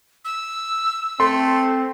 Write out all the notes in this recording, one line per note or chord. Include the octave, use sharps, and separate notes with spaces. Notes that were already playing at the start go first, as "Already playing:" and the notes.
E6
A3 C4 C6